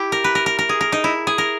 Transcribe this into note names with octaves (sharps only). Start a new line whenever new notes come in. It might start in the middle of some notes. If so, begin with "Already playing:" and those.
Already playing: E4 G4
A#4
B4
A#4
A#4
A#4
G#4
A#4
D#4
E4
G#4
A#4